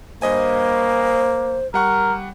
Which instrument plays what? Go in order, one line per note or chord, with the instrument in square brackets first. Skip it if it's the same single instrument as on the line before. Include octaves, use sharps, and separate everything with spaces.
[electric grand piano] G2 D#5 G#5 [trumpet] A#3 [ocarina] C5
[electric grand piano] G3 F#5 C#6 [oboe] A#4